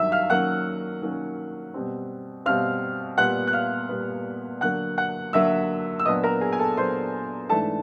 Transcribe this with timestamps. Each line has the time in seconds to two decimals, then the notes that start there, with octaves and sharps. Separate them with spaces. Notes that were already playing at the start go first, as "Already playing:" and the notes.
Already playing: G2 D#3 F#3 E5 E6
0.12 F5 F6
0.30 D#3 F#3 A#3 C#4 F#5 F#6
1.02 D#3 F#3 A#3 C#4
1.74 B2 G3 C4
2.46 B2 G3 C4 F5 F6
3.17 A#2 G3 B3 F#5 F#6
3.47 F#6
3.53 F5 F6
3.89 A#2 G3 B3
4.61 D3 F#3 A#3 F#5 F#6
4.98 F#5 F#6
5.33 D3 F#3 A#3 E5 E6
6.00 E6
6.05 A#2 F#3 B3 D4 D#5 D#6
6.23 A#4 A#5
6.41 G#4 G#5
6.53 G#5
6.59 A4 A5
6.77 A#2 F#3 B3 D4 C5 C6
7.49 G#2 E3 A3 D4 A4 A5